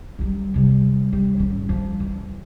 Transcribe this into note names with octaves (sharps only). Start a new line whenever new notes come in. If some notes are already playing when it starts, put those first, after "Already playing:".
F#3 G3
C3 G3
G3
G#1 C#4
F3 G3
E3